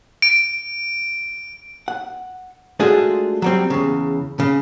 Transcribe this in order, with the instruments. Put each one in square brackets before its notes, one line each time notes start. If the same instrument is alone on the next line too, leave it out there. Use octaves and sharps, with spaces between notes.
[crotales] D7
[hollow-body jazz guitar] F#5
G#3 A3 D4 F4 F#4 G#4
F#3 G3 C4
E2 C#3
C#3